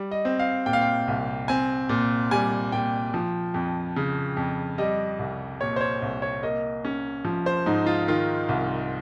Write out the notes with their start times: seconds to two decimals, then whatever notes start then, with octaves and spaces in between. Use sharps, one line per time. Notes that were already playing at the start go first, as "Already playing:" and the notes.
Already playing: G3
0.11 D#5
0.25 C4
0.39 F5
0.66 A#2 G5
0.73 F5
0.81 G5
1.08 C2
1.48 C4 G#5
1.89 A#2
2.31 G3 G#5
2.72 A#2 G5
3.14 F3
3.54 F2
3.96 C#3
4.37 F2
4.78 G3 D#5
5.19 C2
5.61 A#2 C#5
5.76 C5
5.81 C#5
6.02 C2
6.22 C#5
6.43 A#3 D#5
6.85 C#4
7.25 F3
7.46 C5
7.66 G#2 D#4
7.86 F4
8.08 D#3 F4
8.49 C2